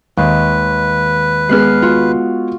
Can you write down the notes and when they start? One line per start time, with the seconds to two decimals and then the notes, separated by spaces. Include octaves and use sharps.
0.17 D#2 G#3 B4
1.49 G#3 B3 G#4 F6 F#6 C7
1.82 F4 F#4